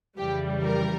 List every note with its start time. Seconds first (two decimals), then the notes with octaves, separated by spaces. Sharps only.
0.17 F2 C#3 E3 G3 G4
0.63 A#4